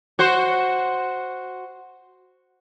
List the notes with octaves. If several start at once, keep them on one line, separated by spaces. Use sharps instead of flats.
F#4 C5